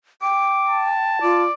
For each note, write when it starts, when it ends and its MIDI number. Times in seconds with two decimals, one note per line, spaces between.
0.22 1.19 79
0.22 0.86 86
0.68 1.43 81
1.22 1.45 65
1.22 1.53 74